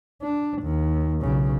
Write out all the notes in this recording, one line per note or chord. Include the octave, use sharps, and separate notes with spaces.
D4
D#2
B1 C#3